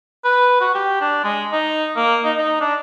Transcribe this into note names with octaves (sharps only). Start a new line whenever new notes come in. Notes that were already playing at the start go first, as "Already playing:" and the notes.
B4
F#4
G4
D4
G#3
D#4
A#3
D#4
D#4
D4